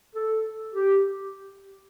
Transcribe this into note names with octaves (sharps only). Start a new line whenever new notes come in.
A4
G4